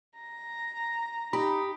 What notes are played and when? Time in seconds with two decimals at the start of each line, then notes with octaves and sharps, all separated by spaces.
0.19 A#5
1.33 D#4 G4 B5